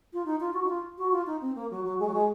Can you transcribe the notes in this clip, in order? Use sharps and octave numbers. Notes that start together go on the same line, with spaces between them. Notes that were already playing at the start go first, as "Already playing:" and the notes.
F4
D#4
F4
F#4
D#4
F4
F#4
F4
D#4
C4
A#3
F#3
F#3
G#3
F#3
G#3